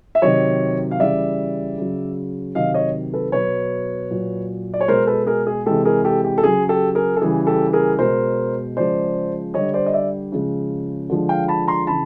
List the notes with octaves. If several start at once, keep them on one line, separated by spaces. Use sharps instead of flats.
E5
C3 D#3 F#3 C#5 D#5
F5
C#3 E3 G3 D5 E5
C#3 F#3
C3 D#3 F#3 D#5 F5
C#5 D#5
A4 B4
B2 F#3 B4 C#5
A#2 F#3
D5
C#5
B2 G#3 A#4 C5
A4 B4
G#4 A#4
G#4
C3 E3 G#3 G4 A4
G#4 A#4
G4 A4
G4
A4
C#3 F#3 G#4
G4 A4
G#4 A#4
A4
C#3 E3 G3 G#4
G4 A4
G#4 A#4
B2 G#3 A#4 C5
C#3 F3 G#3 C5 D5
D3 G3 C#5 D#5
C5 D5
D#5
D5 E5
C#3 F3 G#3
D3 F3 G#3
F5 G5
A5 B5
A#5 C6
C#3 E3 A5 B5